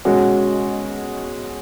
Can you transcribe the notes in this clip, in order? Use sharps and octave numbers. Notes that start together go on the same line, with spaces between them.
B2 G#3 C#4 F#4